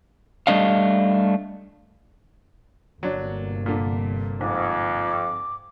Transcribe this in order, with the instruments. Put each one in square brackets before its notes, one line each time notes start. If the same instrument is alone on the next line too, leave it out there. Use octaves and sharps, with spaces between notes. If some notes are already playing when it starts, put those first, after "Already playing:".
[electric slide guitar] G3 A3 D4 D#5 F5
[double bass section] G1 C3 A#3 [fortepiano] F#3 D4
[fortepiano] A#2 D3
[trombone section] F2 [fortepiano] G#2 [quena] D6